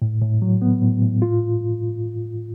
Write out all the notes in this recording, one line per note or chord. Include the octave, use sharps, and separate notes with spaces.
A2
A2
F#3
B3
A2
A2
F4